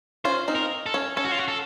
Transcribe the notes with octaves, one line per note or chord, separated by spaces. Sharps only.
C#4 F4 C5
C4 D#4
A#4
A4
C#4
C#4 A4
F#4
F4
F#4
A4